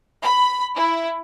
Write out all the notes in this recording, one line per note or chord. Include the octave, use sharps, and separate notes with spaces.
B5
E4